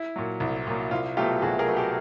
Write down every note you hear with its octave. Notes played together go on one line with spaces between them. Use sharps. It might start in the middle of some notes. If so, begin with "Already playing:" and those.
Already playing: E4
A#2 F#3
C2
A#2 F#3
C2 F4
B2 F#3 A3 F4 G4
C2 F#4 G#4
G#4 A#4
B2 F#3 A3
G4 A4